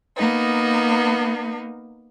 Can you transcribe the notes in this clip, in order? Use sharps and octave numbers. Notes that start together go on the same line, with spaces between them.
A#3 B3 D#4